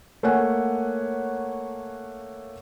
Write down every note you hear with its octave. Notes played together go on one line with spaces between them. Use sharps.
A3 A#3 C#5 F#5 G#5